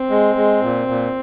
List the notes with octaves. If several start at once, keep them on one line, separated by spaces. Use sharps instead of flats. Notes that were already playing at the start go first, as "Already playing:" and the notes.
Already playing: C4
G#3
G#3
A#2
A#2